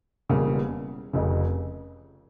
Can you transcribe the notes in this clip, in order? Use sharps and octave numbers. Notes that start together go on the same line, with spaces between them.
E1 E2 C#3 G3 A#3
F1 F2 C#3